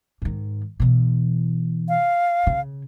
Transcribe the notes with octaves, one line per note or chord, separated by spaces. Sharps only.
G#2 D#3
B2 E3
F5
C#3